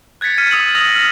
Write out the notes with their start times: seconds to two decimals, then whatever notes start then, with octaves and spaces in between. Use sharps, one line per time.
0.21 F#6 G#6 A6 B6 C#7
0.38 F6 B6 C#7 D#7
0.51 D#6 E6 F#7
0.75 D#6 E6 A#6 F#7
0.95 F6 A#6